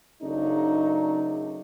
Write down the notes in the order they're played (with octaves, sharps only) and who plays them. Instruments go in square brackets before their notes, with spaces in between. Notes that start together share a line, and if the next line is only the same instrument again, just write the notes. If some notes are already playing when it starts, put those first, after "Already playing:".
[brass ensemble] F#2 C#3 F#3 A3 D4 D#4